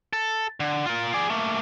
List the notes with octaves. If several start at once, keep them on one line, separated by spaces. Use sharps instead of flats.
A4
D3
F4 A#4
G#4 D5
A3 A#3